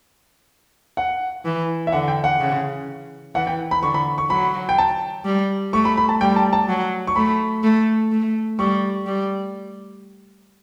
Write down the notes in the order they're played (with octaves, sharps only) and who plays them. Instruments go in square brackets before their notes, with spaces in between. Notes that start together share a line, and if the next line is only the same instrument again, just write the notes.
[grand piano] F#5
[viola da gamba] E3
[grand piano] E5
[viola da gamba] D3 [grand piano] F#5
[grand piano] G5
F#5
[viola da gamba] C#3
[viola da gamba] E3 [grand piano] F#5
[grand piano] G5
B5
[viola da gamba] D3 [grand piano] C#6
[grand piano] B5
C#6
[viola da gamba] F#3 [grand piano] B5
[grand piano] G5
A5
[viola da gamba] G3
[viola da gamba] A3 [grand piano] C#6
[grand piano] B5
B5
A5
[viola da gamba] G3 [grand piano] G5
[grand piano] A5
A5
[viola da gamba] F#3
[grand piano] C#6
[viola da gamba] A3 [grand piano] B5
[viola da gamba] A3
A3
[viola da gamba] G3 [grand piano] C#6
[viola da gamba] G3